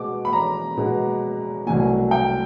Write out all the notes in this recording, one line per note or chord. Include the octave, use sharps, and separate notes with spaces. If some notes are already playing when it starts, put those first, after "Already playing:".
Already playing: B2 G#3 B3 D6
B5
A#5
B2 G#3 B3
C2 B2 F#3 A3 G#5
G5